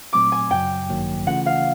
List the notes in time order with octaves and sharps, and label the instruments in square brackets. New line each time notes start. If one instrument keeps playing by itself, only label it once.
[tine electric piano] A#2 F#3 A3 C4 [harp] D6
[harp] G#5
[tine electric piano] F#2 C#3 F#3 [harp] G5
[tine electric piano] A1 G2 D#3 F#3 A#3
[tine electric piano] C#3 E3 A3 C#4 F4 [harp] F#5
[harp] F5